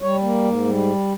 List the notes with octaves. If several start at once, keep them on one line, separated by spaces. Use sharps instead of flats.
G3 C#5
A#3
G#2
G3